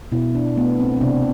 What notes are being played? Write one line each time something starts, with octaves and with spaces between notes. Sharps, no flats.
B2 E4
D4
A3 B3
C4
C4
C3 D4